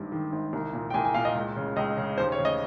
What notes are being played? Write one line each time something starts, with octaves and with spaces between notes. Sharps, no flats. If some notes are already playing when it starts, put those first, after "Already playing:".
Already playing: G#1 G2
D#3
G#1
C2
A#2
G5
C2 G#5
G#5
A#2 F5
D#5
C#2
C#3
C#2 D#5
C#3
D#2 C5
C#5
C#3
D#5